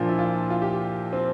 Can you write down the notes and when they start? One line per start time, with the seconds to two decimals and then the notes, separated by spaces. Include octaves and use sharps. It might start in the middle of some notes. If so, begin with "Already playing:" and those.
Already playing: A#2 F3 D4
0.09 E4
0.19 F4
0.50 F4
0.62 G4
1.13 C4